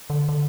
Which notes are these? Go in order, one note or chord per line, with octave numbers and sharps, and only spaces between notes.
D3
D3